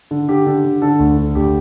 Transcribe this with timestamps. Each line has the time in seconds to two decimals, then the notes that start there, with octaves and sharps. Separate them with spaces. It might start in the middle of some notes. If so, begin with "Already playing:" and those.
0.11 D3
0.28 D3 G4
0.46 D3
0.64 D3
0.82 D3 A4
0.99 D2
1.17 D3
1.35 D2 G4